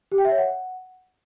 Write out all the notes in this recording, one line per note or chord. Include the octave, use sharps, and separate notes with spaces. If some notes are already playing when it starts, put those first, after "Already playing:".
G4
G5
E5
C#5
F#5